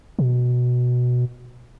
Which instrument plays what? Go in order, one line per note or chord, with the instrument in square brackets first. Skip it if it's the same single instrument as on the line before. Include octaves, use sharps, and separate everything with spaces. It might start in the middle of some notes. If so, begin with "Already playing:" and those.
[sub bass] B2